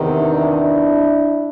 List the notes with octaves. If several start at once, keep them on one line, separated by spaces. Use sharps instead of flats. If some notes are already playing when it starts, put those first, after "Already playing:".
Already playing: E2 C3 D#3
D4 E4